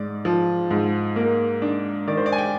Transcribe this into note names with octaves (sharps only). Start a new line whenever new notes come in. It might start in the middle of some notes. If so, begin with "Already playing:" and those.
Already playing: G#2 D5
F3
G#2
A#3
D4
D#3 D5
C5
D5
G#5
G5